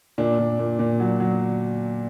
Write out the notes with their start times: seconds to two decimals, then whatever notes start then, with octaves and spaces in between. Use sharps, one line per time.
0.18 A#2 D4
0.39 A#2
0.59 A#2
0.79 A#2
1.00 F#3
1.20 F#3